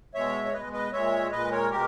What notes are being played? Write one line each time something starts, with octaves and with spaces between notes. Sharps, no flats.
B2 G#3 C#5 E5
C#5
B2 G#3 B4 D#5
B4 D#5
A#2 G#3 C#5 E5
A#2 G#3 B4 D#5
A#4 C#5
B2 G#3 G4 A#4